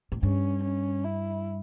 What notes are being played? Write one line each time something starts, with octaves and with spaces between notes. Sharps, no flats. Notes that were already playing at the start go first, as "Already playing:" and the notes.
A2
G2 C#4
C#4
E4